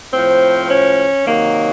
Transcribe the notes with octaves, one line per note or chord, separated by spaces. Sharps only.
A2 F3 C4
C#4
C3 D#3 F#3 A#3